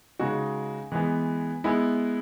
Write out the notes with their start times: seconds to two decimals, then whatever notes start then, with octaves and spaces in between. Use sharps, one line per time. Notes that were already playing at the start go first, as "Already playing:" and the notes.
0.19 C#3 G#3 D#4 F#4
0.92 E3 G#3 B3
1.64 G#3 B3 E4